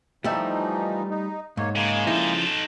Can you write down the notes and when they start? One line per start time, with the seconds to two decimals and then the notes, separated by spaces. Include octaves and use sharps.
0.24 E3 F3 G3 A3 D#4 E5
1.10 D#4
1.57 G#2 A#3 C#5
1.75 C#3 G#3 A#3
2.07 C#3 F3 D#4 E4 A4